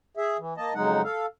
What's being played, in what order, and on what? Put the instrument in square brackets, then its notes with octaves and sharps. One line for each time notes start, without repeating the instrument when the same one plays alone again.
[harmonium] G#4 E5
E3
A#3 D#5 A5
F2 C#3 F#3 G#3 D#4 F#5
A4 F5